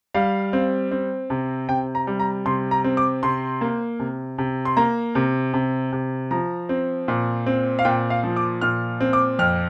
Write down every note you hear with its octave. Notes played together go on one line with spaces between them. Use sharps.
G3 F5
C4
C4
C3
C3 G5
A#5
G3
A#5
C3 C6
A#5
C4
D6
C3 C6
A#3
C3
C3
C6
A#3 A#5
C3
C3
C3
F3 A#5
C4
A#2
C4
F5
A#2 G5
F5
F3
D6
A#2 F6
C4
D6
F2 F6